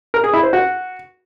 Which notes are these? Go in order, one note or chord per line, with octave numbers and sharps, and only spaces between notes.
A#4
G#4
E4
C5
F#4